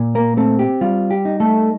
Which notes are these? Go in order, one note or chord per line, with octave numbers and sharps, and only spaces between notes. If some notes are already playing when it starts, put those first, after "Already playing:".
Already playing: A#2
A#3 A#4
A3 C4 A4
G4
G3 F4
G4
D#4
A3 A4